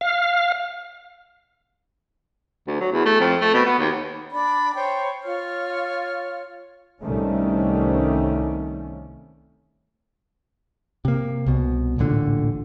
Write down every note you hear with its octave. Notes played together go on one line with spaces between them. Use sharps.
F5
D2
F#3
E2
A3
F2
A3
B2
B3
D#2
D4 D5 B5
C5 C#5 G5
F4 C#5 F6
C2 C3 D#3 G3 A3 C#4
C3 A#3
C2 B2
D1 A1 A#2 D3